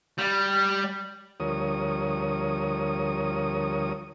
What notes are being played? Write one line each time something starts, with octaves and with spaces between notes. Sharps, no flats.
G3
D2 F3 G3 A#4 C#5 D#6